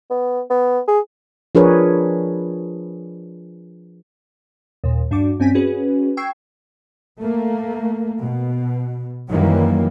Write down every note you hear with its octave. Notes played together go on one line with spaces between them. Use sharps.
B3
B3
G#4
F3 D4 G#4 A#4 B4 C#5
D#2 A#2
G2 D4 F#4 D6
G2 C4 C#4 G#5 B6
C#4 F#4 G#4 B4
G5 C#6 E6 G#6 C7
A3 A#3
B2
F#2 D#3 E3 F#3 G3 A#3